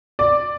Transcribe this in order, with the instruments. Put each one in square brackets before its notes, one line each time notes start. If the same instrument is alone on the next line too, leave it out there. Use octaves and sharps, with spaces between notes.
[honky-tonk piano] D5